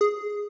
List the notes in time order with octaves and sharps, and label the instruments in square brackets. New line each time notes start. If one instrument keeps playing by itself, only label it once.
[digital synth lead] G#4